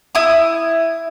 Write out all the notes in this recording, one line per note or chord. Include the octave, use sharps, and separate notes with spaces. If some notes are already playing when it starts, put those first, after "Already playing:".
E4 D#6